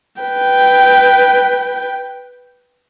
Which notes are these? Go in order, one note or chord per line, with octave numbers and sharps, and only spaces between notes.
B4 G5